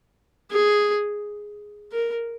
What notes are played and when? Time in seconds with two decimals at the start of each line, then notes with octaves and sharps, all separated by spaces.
0.52 G#4
1.92 A#4